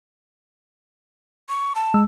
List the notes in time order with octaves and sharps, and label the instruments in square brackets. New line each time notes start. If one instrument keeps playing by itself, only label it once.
[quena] C#6
A5
[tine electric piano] G#3 E6